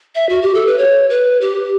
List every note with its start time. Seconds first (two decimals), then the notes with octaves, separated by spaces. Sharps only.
0.15 E5
0.29 F#4
0.42 G4
0.54 A4
0.66 B4
0.78 C#5
1.10 B4
1.41 G4